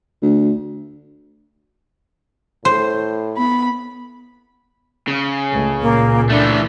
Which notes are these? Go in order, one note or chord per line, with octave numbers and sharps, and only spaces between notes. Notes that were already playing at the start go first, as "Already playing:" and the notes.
D2
A2 C5
B3 B5
C#3
C#2 A3
C#2 A#2 A#3
E3 A3 D4